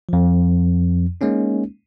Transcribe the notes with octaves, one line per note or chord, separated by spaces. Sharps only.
F2 F3
G#3 A#3 C#4 D#4